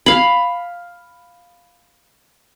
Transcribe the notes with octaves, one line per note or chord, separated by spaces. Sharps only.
F5 B5